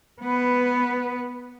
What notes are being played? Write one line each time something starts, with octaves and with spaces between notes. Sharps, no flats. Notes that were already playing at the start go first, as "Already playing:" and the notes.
B3 B4